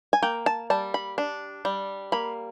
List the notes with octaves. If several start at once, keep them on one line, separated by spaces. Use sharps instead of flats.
G#5
A#3 G5
A5
G3 A5
B5
D4
G3
A#3 B5